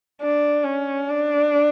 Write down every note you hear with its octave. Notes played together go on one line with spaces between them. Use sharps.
D4
C#4
D4